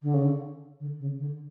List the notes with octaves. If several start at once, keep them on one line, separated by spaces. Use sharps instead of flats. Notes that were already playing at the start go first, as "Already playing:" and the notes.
D3
C#3
D3
D3
C#3
D3